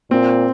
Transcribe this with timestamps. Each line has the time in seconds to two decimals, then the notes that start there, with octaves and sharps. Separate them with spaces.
0.11 A#2 C4